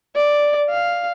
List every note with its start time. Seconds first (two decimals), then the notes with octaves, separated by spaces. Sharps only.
0.16 D5
0.70 F5